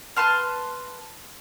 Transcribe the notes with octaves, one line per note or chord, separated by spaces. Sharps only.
B4 A5 C6 F6